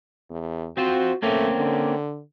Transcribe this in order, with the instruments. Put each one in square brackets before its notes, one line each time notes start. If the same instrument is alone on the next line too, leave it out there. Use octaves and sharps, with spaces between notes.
[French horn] E2
[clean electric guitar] C4 F4 C5 [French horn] F#4
[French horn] A3 [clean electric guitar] A#3 C4 C#4
[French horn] D3